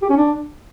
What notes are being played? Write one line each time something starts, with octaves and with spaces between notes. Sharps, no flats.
G4
C#4
D4